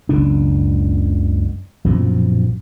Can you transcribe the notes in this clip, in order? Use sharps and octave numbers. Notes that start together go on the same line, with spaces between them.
F#1 C#2 B2 D4
A#1 F#2 B2 F3